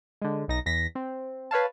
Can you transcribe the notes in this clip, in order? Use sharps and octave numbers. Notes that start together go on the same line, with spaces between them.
D3 G#3
B1 D#4 A#6
E2 A#6 B6
C4
B4 C#5 F5 A5